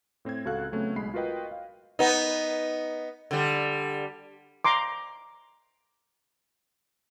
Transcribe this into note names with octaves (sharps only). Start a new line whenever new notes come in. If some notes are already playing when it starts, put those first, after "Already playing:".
A2 C4 C5 G#6
C#2 C4 F#4 A4 F5 F#6
C#3 F#3 A3 B3 C4
B1 G#3 B5 C7
F4 F#4 A#4 B4 D#5 G5
F5
B3 D#4
D3 G3
A#5 C6 D6